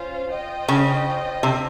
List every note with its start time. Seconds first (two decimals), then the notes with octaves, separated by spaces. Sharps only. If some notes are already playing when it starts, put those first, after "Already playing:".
Already playing: C#4 F4 C5 F5
0.30 F4 C5 D#5 G5
0.68 C#3
1.43 C3